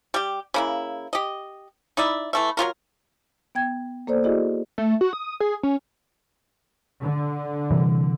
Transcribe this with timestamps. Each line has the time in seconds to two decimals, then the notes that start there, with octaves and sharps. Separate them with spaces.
0.14 G3 G4
0.54 C#3 A#3 E4
1.13 G4 D#5
1.97 D#4 E4 D5 E5
2.33 E3 A3 E5
2.57 F#3 G3 F4 A#4
3.55 B3 G5 G#6
4.07 A#3 A4 C5 D5
4.24 E4 F#4 G#4 D5 D#5
4.78 A3
5.01 F#4
5.13 D#6
5.40 G#4
5.63 C#4
7.02 D3
7.71 C3 E3 G3